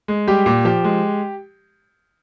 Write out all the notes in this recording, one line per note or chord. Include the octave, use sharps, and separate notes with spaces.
G#3
G3 G4
A#2
F3 G4
G#3